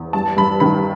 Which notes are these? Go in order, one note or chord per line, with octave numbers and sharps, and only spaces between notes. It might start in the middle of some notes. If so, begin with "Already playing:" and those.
Already playing: E2
G2 A5
G2 B5
D#3 B5